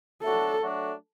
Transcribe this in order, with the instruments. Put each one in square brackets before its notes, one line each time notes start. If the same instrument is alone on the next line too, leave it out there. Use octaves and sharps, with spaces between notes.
[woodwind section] F#3 A3 D4 F#4 [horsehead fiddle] A4
[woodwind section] F#3 A3 D4 F#4